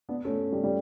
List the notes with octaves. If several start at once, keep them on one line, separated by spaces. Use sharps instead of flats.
B3 D4
A3 C#4
G3
G3